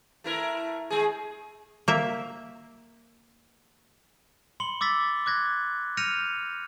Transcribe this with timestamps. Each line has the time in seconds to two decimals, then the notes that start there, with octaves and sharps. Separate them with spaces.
0.24 A3 E4 A#4
0.90 G#3 G#4
1.88 A#3 E5
4.60 B5 C6 C#7 F#7 G7
4.81 D6 E6 A6 B6
5.26 D6 F#6 G#6 A#6
5.97 F6 G6 A#6 C#7 D#7 F7